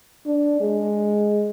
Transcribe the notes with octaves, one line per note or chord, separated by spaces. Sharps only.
D4
G#3